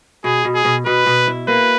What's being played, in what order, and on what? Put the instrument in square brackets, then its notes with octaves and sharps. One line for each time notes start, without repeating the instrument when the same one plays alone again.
[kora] B2 [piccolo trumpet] G#4
[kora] B2
[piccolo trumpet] G#4
[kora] B2
[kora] B2 [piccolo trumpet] B4
[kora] B2
E4
[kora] A#3 [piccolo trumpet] B4